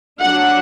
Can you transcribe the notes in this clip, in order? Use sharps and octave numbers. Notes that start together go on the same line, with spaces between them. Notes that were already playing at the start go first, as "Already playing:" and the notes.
F#3 D4 F#5